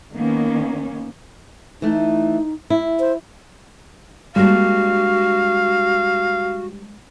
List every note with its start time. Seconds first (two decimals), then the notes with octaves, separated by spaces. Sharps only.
0.13 D#3 A#3 B3 C#4
1.82 E3 A3 D#4
2.70 E4
3.00 C5
4.36 G3 G#3 A#3 D4 F#4 F5